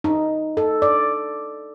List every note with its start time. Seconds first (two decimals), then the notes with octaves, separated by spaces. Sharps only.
0.04 D#4
0.57 A4
0.82 D5